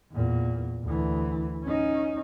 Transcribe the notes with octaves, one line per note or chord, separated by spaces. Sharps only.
E2 A#2
D2 E3
C#4 D#4